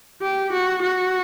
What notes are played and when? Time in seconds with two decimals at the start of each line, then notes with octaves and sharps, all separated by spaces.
0.22 G4
0.52 F#4
0.83 F#4